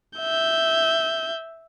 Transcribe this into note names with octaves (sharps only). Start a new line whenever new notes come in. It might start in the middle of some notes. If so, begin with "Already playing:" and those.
E5 G6